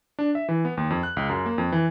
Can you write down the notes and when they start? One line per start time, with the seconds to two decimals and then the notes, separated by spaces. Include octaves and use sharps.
0.19 D4
0.35 E5
0.49 E3
0.65 B3
0.77 D#2
0.90 F2
1.03 F#6
1.17 C#2
1.29 F#2
1.46 A#3
1.58 F2
1.72 E3